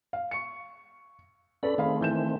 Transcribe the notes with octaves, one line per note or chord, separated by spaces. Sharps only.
F5
C#6 C#7
C#4 A4 B4 D5 B5
D#3 A3 C4 G#4 F5 B5
E3 G6 E7